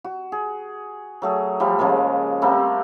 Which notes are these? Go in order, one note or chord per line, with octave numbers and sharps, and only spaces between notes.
F#4
G#4
F#3 A3 G#4
F3 G3 A3
C#3 F3 G#3 A#3
G3 A3 A#3 C4